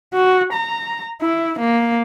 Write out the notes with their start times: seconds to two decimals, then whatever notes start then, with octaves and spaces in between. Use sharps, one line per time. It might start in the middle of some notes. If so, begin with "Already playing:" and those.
0.14 F#4
0.53 A#5
1.21 E4
1.59 A#3